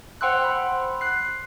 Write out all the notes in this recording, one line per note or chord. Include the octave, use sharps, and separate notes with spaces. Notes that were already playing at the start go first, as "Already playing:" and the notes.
C5 F#5 G5 C6 E6 F#6
B5
F#6 C7